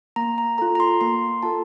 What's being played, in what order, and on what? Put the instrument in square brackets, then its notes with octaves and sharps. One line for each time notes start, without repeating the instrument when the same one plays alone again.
[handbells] A#3 A#5
A#5
F4 A4 A#5
A#5
C6
A#3 C6
F4 A4 A5